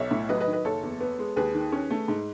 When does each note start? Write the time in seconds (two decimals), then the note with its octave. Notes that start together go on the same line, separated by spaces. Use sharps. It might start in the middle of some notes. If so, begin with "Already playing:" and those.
Already playing: B1 C#5 E5
0.11 A2
0.29 F#3 B4 D#5
0.40 B4 D#5
0.47 D#3
0.53 B4 D#5
0.65 F#1 A4 C#5
0.83 E2
1.00 B3
1.19 G#3
1.36 D#2 G#4 B4
1.54 D#3
1.72 C#4
1.91 A3
2.08 G#2